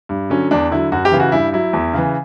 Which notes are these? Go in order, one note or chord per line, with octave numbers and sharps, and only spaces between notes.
G2
D3 F#3 C#4
E2 D4
D3 F#3 E4
F#2 F#4
G4
C#3 E3
F#4
G2 E4
F#3 E4
E2
C#3 E3